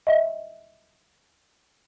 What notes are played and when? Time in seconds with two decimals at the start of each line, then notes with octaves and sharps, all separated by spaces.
0.07 D#5 E5